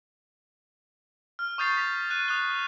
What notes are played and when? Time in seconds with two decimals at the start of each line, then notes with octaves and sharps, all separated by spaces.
1.39 F6
1.58 C#6 D#6 G6 A6 C7
1.75 D#6 B6
2.10 F#6 D#7
2.28 D#6 F#6 G7